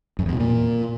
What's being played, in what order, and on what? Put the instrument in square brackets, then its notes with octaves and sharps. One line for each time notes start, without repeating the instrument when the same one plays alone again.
[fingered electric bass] F#2
E2
B2
A#2